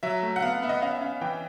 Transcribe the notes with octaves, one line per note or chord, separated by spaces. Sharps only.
F#3 E5
A3
F#5
B3 F5
B3 E5
D#5
C#4 F5
E5
C#4 F5
E3 G5